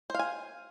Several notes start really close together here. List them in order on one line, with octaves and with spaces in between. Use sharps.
C5 F5 G#5